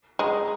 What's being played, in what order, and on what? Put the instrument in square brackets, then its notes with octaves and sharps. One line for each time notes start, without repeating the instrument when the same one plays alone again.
[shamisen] G#3 [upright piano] A#5